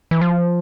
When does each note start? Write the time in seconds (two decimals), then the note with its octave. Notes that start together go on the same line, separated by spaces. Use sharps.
0.11 E3
0.21 F3